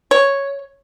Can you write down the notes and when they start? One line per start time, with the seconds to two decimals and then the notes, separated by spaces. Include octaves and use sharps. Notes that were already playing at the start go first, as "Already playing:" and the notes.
0.11 C#5